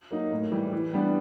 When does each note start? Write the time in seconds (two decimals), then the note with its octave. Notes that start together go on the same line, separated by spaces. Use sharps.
0.10 F#3 A#3 D#4
0.31 A2
0.52 E3 G3
0.73 E3
0.94 G3 B3 D4